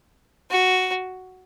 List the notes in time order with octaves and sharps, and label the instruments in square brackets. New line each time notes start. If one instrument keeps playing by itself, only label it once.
[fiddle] F#4